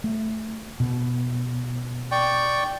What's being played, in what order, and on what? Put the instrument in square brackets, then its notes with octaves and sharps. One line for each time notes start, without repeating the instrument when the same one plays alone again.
[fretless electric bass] A3
B2
[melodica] D5 G5 C#6